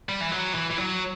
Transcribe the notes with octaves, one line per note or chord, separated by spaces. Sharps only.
G3
E3
F#3
E3
E3
F#3